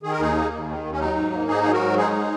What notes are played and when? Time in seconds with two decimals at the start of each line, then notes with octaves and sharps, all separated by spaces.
0.03 D#3 G#4
0.12 A#4
0.19 D#2 D#4 G#4
0.35 A#3
0.51 D#2
0.68 D#3
0.84 D#2
0.92 C#4
1.00 F#3 D#4
1.15 G#2
1.32 A#3
1.48 G#2 D#4 G#4
1.63 F#3 G#4
1.73 F#4 A#4
1.81 G#2
1.97 G#3 D#4 G#4
2.13 G#3